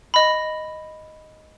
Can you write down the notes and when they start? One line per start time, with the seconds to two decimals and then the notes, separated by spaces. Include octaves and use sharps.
0.14 D#5 B5